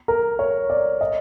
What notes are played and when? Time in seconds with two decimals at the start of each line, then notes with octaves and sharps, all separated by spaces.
0.08 A#4
0.39 C#5
0.70 D5
1.01 D#5